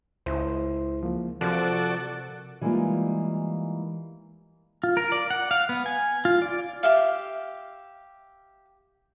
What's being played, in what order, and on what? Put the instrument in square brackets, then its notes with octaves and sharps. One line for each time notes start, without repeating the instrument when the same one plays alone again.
[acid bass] C#2 [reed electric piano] E4 C5
[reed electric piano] F3 A#3
[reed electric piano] C3 A#4 [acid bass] F3 [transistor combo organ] F#4 A4 D5
[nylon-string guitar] E3 G3 G#3 A#3 D#4 F4
[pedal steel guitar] F4
A#4
D5
F#5
F5
B3
G#5
F4
D5
[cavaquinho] G4 E5 F5